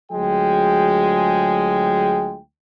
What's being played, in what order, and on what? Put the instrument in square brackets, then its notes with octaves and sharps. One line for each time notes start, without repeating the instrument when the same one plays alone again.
[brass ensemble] D2 F#3 G#3 F4 G#4 G5